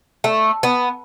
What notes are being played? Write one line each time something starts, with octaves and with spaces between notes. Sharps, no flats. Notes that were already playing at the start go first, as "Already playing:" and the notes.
A3
B3